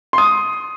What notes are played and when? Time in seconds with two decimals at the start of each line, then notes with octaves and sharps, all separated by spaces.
0.13 C6
0.18 D#6